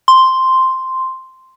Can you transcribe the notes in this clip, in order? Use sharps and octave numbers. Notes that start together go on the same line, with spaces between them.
C6